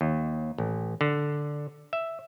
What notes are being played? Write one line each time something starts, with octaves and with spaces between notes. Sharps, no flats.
D#2
A1
D3
E5